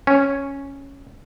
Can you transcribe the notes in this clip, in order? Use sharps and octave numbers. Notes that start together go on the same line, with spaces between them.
C#4